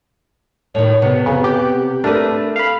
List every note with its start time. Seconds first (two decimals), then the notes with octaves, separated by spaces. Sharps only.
0.75 A2 D#3 C#5
1.02 C3 B3
1.26 F2 C#3
1.44 G4
2.04 A3 D4 A#4 B4
2.56 F5 B5